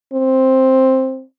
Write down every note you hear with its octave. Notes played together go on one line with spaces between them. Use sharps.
C4